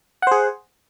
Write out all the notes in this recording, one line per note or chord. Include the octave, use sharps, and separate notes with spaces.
G#4 C5 F#5